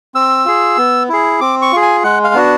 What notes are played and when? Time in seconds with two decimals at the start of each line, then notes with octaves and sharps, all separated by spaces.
0.14 C4 E6
0.45 F4 G#4
0.77 B3
1.09 E4 G#4
1.41 C4 D6
1.62 C#6
1.72 F4 G#4
1.82 G#5
2.04 G#3 F#5
2.24 F5
2.34 B3 D4 F#4